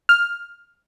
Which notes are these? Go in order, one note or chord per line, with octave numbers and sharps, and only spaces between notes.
F6